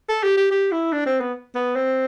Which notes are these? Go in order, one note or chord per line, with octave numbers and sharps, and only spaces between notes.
A4
G4
G4
G4
E4
D4
C4
B3
B3
C4